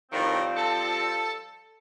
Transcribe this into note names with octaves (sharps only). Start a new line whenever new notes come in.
A2 D#3 F3 G3 C4
A4